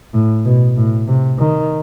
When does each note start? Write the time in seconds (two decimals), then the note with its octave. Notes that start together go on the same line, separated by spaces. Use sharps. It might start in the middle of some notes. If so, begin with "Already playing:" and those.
0.14 A2
0.45 B2
0.77 A2
1.07 C3
1.38 D#3